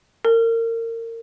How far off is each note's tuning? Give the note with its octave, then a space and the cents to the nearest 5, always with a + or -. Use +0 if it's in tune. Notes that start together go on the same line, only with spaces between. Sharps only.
A#4 -30